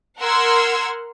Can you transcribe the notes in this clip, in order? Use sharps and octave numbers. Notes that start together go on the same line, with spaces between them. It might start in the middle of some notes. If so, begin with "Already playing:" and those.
A#4 F#5 C6 E6 F6 G#6